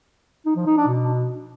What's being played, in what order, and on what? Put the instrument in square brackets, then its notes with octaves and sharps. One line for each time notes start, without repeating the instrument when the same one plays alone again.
[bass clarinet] D#4
F3
D#4
D4
B2